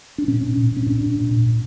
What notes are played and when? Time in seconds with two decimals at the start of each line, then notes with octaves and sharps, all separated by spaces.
0.18 D4
0.28 A#2 C#4
0.43 A#2
0.57 A#2
0.72 A#2 C#4
0.87 A#2 D4
1.01 A#2
1.15 A#2
1.31 A#2
1.46 A2